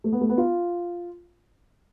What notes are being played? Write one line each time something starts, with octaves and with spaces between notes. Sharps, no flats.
A3
B3
A3
B3
F4